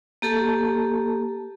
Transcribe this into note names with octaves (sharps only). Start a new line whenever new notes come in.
A#3 G4 A4 A5